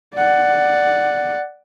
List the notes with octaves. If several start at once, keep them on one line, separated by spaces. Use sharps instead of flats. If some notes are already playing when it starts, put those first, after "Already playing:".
D5 F#5